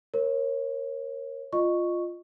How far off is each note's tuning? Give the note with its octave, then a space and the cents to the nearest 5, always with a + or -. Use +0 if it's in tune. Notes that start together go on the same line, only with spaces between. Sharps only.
A#4 +10 C#5 -25
F4 +0 D#5 -20 C#6 +0